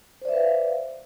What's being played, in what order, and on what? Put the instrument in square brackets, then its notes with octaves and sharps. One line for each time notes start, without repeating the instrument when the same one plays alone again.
[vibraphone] C5
D5
E5
B4
F5